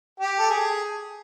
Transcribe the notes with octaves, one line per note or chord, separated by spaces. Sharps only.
G4
A4
G#4